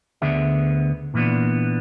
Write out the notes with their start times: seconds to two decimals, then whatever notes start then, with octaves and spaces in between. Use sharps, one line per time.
0.22 D2 D3 B3 D4 G#4 E5
1.14 A#2 E3 A#3 B3 D4